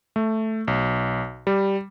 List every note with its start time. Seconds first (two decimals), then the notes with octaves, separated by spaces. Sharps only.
0.16 A3
0.68 B1
1.47 G3